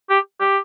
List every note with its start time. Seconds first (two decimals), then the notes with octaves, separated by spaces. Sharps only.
0.09 G4
0.40 G4